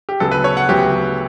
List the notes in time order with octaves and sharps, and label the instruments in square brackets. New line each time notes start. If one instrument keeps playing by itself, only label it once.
[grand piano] G4
D2 C#3 F#3 B3 A4
B4
C#5
F#5
D2 C#3 F#3 B3 G4